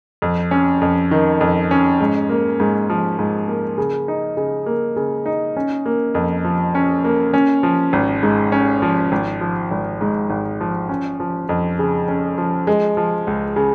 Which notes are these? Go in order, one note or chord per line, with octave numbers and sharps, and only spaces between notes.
F2
C#4
F2
D#3
F2
C#4
G#2
A#3
G#2
F3
G#2
A#3
C#3
D#4
C#3
A#3
C#3
D#4
C#4
A#3
F2
F3
C#4
A#3
C#4
F3
G#1
G#2
C#4
F3
G#1
F3
G#1
G#2
G#1
F3
C#4
F3
F2
C#3
C#4
F3
G#3
F3
C#2
C#3